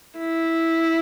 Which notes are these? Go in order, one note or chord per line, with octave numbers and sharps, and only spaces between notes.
E4